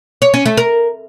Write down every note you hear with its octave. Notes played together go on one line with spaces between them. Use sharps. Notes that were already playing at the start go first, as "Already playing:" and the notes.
C#5
C#4
A3
A#4